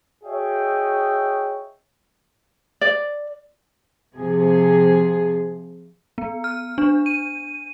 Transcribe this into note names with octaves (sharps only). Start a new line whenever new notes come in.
F#4 G#4 C#5 D#5 E5 G5
D5
C3 F3 G#4
B3
F6
D4
D#7